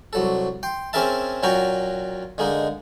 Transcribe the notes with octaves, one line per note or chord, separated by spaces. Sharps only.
C2 F#3 A4
G5 C6
C4 C#4 G#4 A#4 E5 A5
A#2 F#3 C#4 F#4 G5 A#5
D3 G#3 A#3 D#4